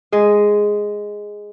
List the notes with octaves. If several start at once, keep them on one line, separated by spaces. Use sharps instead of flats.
G#3 G#4